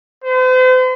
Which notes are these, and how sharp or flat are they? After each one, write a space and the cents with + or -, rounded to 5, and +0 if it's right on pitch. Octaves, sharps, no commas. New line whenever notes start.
C5 -45